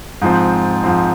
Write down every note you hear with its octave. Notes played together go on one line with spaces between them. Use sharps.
G#2 F3 C4
G#2 F3 C4